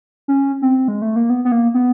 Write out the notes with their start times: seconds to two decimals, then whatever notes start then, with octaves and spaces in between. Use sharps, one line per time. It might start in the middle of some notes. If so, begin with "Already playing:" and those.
0.28 C#4
0.62 C4
0.88 G#3
1.02 A3
1.16 A#3
1.30 B3
1.45 B3
1.52 A#3
1.74 B3